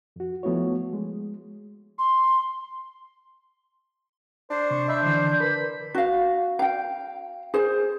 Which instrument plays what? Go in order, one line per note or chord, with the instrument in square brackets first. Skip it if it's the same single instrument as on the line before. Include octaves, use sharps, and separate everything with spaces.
[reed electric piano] F2 F#4
F3 A3 B3 E4 F#4 C#5
G#3
[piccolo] C6
[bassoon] D4 [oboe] C5
[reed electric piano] C3 [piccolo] C#6
[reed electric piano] D#5 B5 [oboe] E5 [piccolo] G6
[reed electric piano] D3 E3 [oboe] C5
[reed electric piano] A#4 B4 [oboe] B5
[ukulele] F#4 F5
F5 G5
G#4 C5